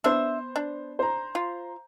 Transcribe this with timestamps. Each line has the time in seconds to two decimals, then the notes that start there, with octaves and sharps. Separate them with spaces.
0.04 B3 D4 C5 E5
0.56 D4
0.99 C5 A#5
1.35 F4